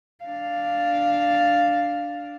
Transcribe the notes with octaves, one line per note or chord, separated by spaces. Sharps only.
D4 F5